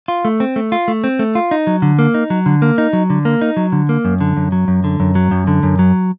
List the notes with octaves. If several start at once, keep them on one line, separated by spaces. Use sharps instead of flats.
F4
A3
C4
A3
F4
A3
C4
A3
F4
D#4
F#3
D3
A#3
D#4
F#3
D3
A#3
D#4
F#3
D3
A#3
D#4
F#3
D3
A#3
F#2
D3
F#2
F#3
F#2
D3
F#2
F#3
F#2
D3
F#2
F#3